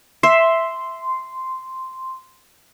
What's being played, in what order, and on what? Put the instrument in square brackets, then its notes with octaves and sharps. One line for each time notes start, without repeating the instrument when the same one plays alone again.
[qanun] E5 [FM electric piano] C6